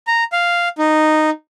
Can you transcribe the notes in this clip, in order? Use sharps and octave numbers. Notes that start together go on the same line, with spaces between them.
A#5
F5
D#4